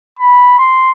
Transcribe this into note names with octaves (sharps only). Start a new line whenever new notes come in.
B5
C6